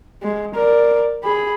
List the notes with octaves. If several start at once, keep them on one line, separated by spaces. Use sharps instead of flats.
G#3
A#4 D5
G#4 B5